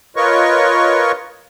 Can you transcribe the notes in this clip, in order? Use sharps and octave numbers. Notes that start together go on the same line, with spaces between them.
F4 A#4 B4 C#5 D#5 C#6